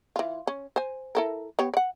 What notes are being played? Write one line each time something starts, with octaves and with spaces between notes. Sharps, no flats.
E3 F4
C#4
C5 G#5
E4 A4 A#4
B3 G4 C#5
D5 F#5